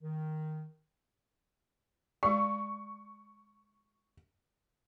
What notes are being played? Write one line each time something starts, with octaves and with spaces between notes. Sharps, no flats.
D#3
G#3 D5 C#6